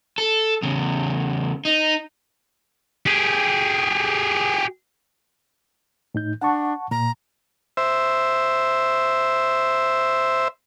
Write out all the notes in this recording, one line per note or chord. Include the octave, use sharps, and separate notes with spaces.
A4
E2 C#3
D#4
G4 G#4
A2 D#4 G6
D4 F#5 A5 C#6
A#2 A#5
C5 E5